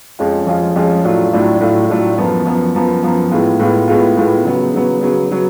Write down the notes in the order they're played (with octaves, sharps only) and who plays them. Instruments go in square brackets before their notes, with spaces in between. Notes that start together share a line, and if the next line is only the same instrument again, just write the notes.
[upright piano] F2 F3 G#3 C#4 F4
F2 F3 G#3 C#4 F4
F2 F3 G#3 C#4 F4
A2 F#3 A3 D4 F4
A2 F#3 A3 D4 F4
A2 F#3 A3 D4 F4
A2 F#3 A3 D4 F4
F#2 F3 B3
F#2 F3 B3
F#2 F3 B3
F#2 F3 B3
A2 G#3 B3 F4
A2 G#3 B3 F4
A2 G#3 B3 F4
A2 G#3 B3 F4
C#3 F#3 B3
C#3 F#3 B3
C#3 F#3 B3
C#3 F#3 B3